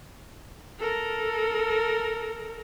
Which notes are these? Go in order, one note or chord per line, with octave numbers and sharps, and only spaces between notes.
A4 A#4